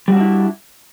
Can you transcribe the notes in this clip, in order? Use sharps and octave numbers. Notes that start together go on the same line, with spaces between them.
G3 D4 E4 F#4